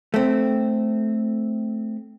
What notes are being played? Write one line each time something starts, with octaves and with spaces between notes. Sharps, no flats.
A3 C4